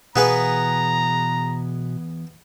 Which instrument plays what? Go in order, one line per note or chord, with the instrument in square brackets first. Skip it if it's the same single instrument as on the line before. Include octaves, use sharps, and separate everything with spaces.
[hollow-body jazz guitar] E2 E5 F5 [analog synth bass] B2 [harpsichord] B3 G#4 B4 [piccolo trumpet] A#5